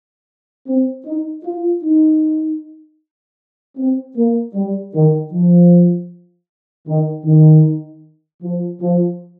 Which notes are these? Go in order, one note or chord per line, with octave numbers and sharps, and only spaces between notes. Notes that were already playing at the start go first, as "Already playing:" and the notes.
C4
D#4
F4
D#4
C4
A#3
G3
D#3
F3
D#3
D#3
F3
F3